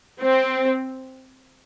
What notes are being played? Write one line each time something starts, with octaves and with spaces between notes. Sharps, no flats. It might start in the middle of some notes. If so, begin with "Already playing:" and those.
C4